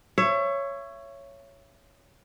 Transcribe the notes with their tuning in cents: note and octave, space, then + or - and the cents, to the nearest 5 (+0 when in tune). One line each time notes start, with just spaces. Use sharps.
C#5 +0 E5 +30